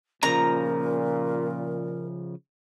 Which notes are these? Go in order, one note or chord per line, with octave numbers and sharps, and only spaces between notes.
A#2 C#3 F3 A#4 A#5